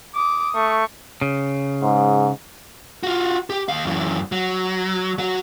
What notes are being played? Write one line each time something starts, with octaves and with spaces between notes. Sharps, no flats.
D6 D#6
A3 C#6
C#3
G#2
F4 F#4
G4
D#2 F5
F#2 E3
F#3
F#3 F#4